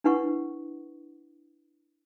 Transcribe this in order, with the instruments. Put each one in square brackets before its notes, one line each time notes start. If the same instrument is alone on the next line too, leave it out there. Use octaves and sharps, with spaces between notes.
[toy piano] D4 E4 B4 F#5 C#6